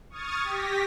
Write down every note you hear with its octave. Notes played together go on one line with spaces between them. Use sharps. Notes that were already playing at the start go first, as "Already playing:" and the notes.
C#6 D#6 F6 G#6 A6
G4 A#6 B6